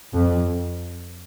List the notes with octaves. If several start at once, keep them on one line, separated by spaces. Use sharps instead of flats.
F2